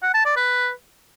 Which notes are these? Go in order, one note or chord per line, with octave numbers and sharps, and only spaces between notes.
F#5
A5
D5
B4